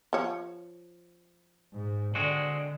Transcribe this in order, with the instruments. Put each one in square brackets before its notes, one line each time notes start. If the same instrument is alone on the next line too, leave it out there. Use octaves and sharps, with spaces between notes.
[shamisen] F3 C#5
[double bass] G#2
[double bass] D3 [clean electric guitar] G#3 C4 F#4